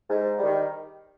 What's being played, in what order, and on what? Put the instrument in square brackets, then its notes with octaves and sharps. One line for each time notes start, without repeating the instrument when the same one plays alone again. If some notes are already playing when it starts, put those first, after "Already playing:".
[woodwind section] G#2
D#3 G3